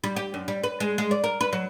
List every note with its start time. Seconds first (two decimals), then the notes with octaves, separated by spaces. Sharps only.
0.04 G3
0.16 G4
0.34 F#2
0.48 G3
0.63 B4
0.80 G#3
0.98 G#3
1.11 D5
1.24 A#4
1.41 B4
1.53 F#3